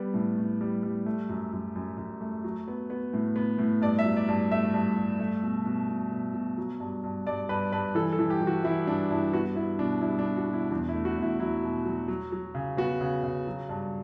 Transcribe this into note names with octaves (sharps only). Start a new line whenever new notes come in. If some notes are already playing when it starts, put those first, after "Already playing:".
Already playing: G3 B3
A2
A2
G3
G3
A3
F#2
F#2
F#2
F#2
A3
F#3
B3
B3
A2
B3
A2
G2 D5
E5
F#3
D5
G2
A3 E5
G2
G2
A3
B2
B2
B2
B2
B2
F#3
G2
G2
G2 D5
G2 B4
G2 B4
E3 A4
A4
E3
G4
E3
F#4
E3 E4
G2 D4
G2 E4
B3 F#4
B3 E4
B2 D4
G3 E4
D4
B2
F#4
B2
E4
E2 D4
E4
A3
F#4
E2 E4
F#3 E4
B2
F#3
F#3
F#3
C#3
B3 F#4
C#3
C#3
F#3
G2